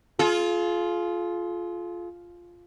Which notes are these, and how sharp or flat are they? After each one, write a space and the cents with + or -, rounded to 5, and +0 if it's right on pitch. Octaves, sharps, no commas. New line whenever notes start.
F4 +0 G#4 +45